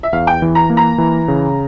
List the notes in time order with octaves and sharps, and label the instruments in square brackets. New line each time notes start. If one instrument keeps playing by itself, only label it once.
[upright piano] E5
[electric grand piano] E2 [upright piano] F5
[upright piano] G5
[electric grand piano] E3
[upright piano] A#5
[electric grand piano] A#3
[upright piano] A#5
[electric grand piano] E3
C#3